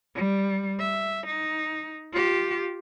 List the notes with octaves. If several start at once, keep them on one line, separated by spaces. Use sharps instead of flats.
G3
E5
D#4
F4 G4